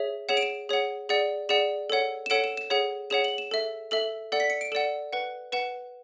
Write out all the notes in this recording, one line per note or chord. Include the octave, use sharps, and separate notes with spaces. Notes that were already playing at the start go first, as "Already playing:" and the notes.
Already playing: G#4 C#5 E5
G#4 C#5 F#5 E7
D7
E7
G#4 C#5 F#5
G#4 D5 F#5
G#4 D5 F#5 E7
A4 C#5 F#5
E7
A4 C#5 F#5 D7
E7
E7
G#4 C#5 F#5
G#4 C#5 F#5 E7
F#7
E7
A4 E5
A4 E5 F#7
A4 D5 F#5
B6
C#7
D7
A4 D5 F#5 E7
B4 F#5
B4 F#5 E7